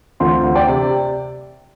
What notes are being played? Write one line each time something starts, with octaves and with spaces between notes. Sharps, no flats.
D2 C4 F4
D2
D5 G5
C3